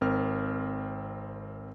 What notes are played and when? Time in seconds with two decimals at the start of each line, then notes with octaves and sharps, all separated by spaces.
0.01 G#1 C4 A#4 F6